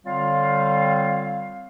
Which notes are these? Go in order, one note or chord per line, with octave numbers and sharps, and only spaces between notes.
D3 G3 C4 F4 C#5 F5